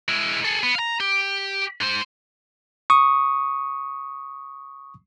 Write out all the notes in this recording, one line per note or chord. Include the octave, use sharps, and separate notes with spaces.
G#3 E4
G#4 A4
B3
F5 A#5
G4
G#2 C5
C#6 D#6